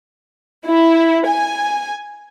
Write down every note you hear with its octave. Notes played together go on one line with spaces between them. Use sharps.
E4
G#5